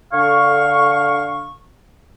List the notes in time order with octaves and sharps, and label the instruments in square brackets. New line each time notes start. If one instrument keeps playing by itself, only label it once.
[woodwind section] D3 A4 F5 C#6